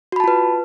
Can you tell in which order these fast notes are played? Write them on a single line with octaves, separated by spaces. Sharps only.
F#4 B5 A5 F4 B4